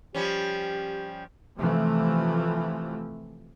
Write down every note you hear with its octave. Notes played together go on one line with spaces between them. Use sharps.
F3 G3 C#4 G4
C3 E3 F3 A3